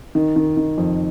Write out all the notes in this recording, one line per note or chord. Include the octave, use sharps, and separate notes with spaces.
D#3
D#3
D#3
F2